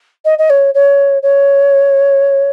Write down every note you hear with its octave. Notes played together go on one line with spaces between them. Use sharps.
D#5
D#5
C#5
C#5
C#5